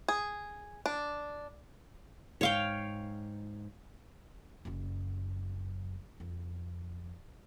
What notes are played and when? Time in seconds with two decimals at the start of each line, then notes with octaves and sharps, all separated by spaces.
0.08 G#4
0.86 D4
2.41 G#2 C#5 F5 G5
4.65 F#1 F#2
6.20 F2